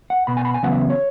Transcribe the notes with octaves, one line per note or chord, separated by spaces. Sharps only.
F#5
B2 B3 B5
G#5
B5
G#5
E2 C#3 F#3 B3 F#5
E5
C#5